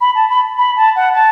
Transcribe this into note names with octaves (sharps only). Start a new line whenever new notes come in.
B5
A5
B5
B5
A5
F#5
A5